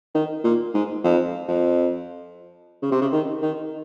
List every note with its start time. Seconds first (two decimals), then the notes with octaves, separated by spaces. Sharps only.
0.15 D#3
0.44 A#2
0.74 G#2
1.04 F2
1.48 F2
2.82 C#3
2.92 C3
3.02 C#3
3.12 D#3
3.42 D#3